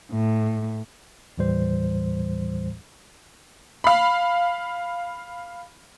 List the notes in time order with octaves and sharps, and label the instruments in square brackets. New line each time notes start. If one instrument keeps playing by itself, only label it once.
[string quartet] A2
[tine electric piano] D#2 A2 E3 G3 C5
[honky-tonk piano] F5 B5